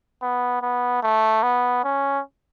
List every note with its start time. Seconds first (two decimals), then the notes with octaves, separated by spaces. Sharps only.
0.22 B3
0.62 B3
1.03 A3
1.43 B3
1.84 C#4